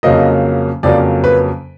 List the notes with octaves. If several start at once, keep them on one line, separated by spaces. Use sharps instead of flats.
F2 C#3 F#3 A#3 D#5
F2 C#3 F#3 A#3 D5
B4